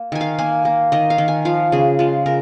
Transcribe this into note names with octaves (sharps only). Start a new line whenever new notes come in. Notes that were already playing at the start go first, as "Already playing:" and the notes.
Already playing: A#3
D#3 G#5
F5
A#3 G#5
A#3
D#3 D#5
F5
D#3
G#5
F3 F5
C#3 G#4
G#3 F4
C#3 A#4